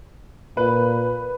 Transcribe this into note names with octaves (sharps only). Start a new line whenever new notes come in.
A#2 B4